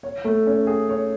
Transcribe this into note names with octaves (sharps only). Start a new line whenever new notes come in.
C#5
A3
C#4
G#4
C#5